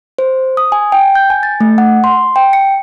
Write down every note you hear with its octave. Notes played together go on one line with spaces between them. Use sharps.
C5
D#6
G#5
G5
G6
G#5
A6
A3
F#5
C6
G5
C#7